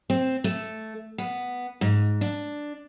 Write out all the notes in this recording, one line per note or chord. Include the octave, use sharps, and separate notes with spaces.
C4
A3
B3
G#2
D4